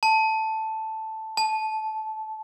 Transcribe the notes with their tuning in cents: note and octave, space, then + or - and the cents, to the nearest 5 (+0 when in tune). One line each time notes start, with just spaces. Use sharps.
A5 +0
A5 -15